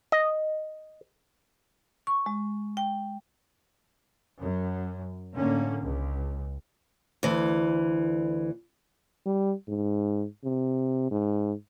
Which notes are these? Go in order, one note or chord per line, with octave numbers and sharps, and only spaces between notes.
D#5
C#6
G#3
G5
F#2
A2 D3 A#3 C#4
C#2
D2 E3
G3
G#2
C3
G#2